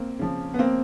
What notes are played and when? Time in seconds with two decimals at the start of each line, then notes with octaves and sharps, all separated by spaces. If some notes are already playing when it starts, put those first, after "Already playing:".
Already playing: A#3 C4
0.19 C#3 F3
0.54 B3
0.59 A#3 C4